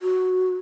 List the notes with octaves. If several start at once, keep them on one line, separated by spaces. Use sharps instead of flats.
F#4